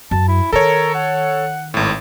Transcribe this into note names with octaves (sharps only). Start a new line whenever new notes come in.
F#2 A5
E4
D#3 A4 A#4 C#5
F#5
G#1 A2